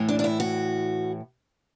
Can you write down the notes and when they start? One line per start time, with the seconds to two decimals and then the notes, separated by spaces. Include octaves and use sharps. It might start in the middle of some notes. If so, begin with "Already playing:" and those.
Already playing: A2 E3
0.09 D4
0.19 D4
0.24 E4
0.40 F#4